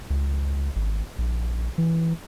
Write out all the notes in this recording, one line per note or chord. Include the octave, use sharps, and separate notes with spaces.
C#2
G#1
A#1
E3